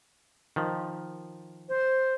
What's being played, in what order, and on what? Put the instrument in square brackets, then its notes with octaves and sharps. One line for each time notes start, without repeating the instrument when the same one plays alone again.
[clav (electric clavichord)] D#3 F3
[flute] C5